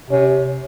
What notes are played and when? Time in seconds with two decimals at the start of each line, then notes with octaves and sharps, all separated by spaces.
0.10 C3 C#4